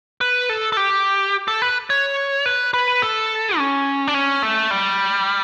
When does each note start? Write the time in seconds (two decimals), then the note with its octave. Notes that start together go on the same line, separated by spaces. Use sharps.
0.21 B4
0.49 A4
0.72 A4
0.77 G4
1.48 A4
1.62 B4
1.90 C#5
2.46 B4
2.74 B4
3.02 A4
3.58 C#4
4.07 D4
4.14 C#4
4.43 A3
4.71 G3